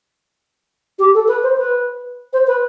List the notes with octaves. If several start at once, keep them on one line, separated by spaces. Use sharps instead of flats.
G4
A4
B4
C5
B4
C5
B4